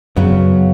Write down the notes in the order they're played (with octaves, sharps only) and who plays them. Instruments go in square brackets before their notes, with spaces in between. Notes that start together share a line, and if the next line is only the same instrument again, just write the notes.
[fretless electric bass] F#2 [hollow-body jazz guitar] C#3 F#3 B3